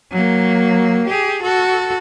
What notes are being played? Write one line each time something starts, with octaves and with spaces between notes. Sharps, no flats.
F#3 A#3
G4 G#4
F#4 A4